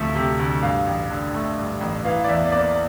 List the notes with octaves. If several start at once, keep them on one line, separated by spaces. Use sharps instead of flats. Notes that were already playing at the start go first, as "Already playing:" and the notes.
Already playing: D2 C3 F3 A3
C3
D2
G2 F5
A1
D3
A3
G2
A1
E3 F5
D5
E2 E5
A#3 D5